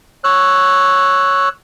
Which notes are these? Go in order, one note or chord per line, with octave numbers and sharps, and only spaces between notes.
C#5 E6 F#6